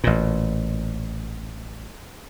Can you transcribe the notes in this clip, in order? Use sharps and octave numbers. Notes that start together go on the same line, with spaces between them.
A1 A#2